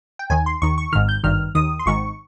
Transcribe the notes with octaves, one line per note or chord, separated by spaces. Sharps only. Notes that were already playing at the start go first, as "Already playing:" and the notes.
G5
D#2 D#3 G#5
C6
D#2 D#3 C#6
C#6
G#1 G#2 D#3 F6
G6
G#1 G2 D#3 F6
D#2 D#3 D#6
C6
G#1 G#2 D#3 C#6